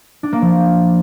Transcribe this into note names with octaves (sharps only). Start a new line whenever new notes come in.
D4
A#3
F3